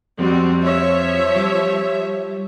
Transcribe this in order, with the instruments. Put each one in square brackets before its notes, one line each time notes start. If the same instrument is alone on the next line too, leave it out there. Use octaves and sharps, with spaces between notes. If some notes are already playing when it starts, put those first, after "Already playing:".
[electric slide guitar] F2 [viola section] G3 C4 F#4
[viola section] F3 C#5 E5
[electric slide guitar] G3